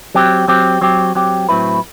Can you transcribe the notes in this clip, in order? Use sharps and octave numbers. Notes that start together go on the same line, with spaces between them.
F#3 C4 G4
F#3 C4 G4
F#3 C4 G4
F#3 C4 G4
A2 F#3 C4 E4 B4